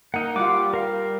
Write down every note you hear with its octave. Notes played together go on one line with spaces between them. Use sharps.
A#3 D#4 A#4 F#5
G3 F4 F#5 D6
A#4 F5